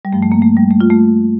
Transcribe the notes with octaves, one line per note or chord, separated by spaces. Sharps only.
G3
G2 F3 A3
A3
A#3
A3
G3
A3
F4
A3